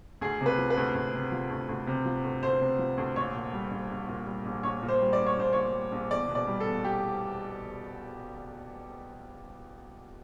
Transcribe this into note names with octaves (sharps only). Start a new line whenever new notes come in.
D2 G#4
C3
B4
F3
B4
D2
D2
C3
F3
D2
D2
C3
F3
D2
D2 C5
C3
F3
D2
A#1 C#5
A#2
G3
A#1
A#1
A#2
G3
A#1
A#1 C#5
A#2
C5
G3
D5
A#1
C#5
A#1 C5
A#2 C#5
G3
A#1
E2 D5
B2
D5
G3
A4
E2
G4